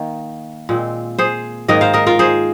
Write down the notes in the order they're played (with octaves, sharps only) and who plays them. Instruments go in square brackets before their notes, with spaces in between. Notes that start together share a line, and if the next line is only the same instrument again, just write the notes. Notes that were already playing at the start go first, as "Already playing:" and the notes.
Already playing: [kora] D#3 A#3
A#2 G#3 C4
G#4 C5
G#2 D#3 A#3 A#4 D#5
C5 F5
A#4 D#5
F4 A#4
G#4 C5